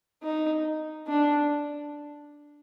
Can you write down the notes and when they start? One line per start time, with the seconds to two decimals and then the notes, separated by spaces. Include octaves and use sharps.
0.23 D#4
1.08 D4